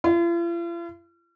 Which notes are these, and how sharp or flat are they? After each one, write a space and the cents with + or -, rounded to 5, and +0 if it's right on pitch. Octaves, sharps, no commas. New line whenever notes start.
F4 -45